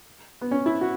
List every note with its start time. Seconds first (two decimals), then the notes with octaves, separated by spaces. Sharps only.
0.41 B3
0.51 C#4
0.66 E4
0.81 F#4